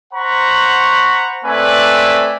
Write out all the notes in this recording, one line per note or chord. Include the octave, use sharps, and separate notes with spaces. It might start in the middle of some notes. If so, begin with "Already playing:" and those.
C5 F#5 A#5 B5 C#6
A3 C4 B4 D5 G#5